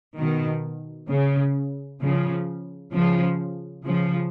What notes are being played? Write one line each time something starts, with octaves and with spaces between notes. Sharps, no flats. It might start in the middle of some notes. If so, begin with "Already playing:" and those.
B2 D#3
C#3
C#3 F3
C#3 F3
C#3 F3